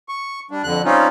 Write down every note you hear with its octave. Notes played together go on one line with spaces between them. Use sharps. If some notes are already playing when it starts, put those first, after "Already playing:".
C#6
G3 D4
F2 D3 F#6
G3 C4 C#4 D#4 F4